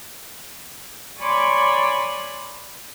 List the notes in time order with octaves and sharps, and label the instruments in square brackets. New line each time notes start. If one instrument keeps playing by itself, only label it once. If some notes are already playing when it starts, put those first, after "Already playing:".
[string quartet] C#5 D5 G#5 B5 C6 D6